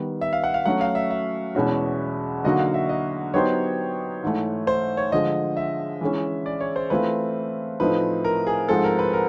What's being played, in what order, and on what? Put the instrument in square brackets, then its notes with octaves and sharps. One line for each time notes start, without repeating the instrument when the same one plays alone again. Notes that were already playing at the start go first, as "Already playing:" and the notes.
Already playing: [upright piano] D#3 G3 B3
[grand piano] E5
F5
F#5
F5
[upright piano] F#3 A3 C#4 F#4 [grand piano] F#5
[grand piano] F5
E5
E5
[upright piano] E2 B2 G#3 C#4 F#4
[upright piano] D3 F#3 A#3 D#4 F#4 [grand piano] D#5
[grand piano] F5
E5
D#5
[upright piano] F#3 B3 D#4 G4 C5 [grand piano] C#5
[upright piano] G#2 E3 A3
[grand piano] C5
C#5
[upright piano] D3 F3 G#3 [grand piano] D#5
[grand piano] E5
[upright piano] E3 G#3 C#4
[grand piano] D5
C#5
C5
[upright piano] E3 A3 C4 F4 [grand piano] B4
[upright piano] A2 F3 A3 C4 D#4 [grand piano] B4
[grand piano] A#4
G#4
[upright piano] G#2 F3 G#3 C4 [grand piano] A4
[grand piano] A#4
B4
A#4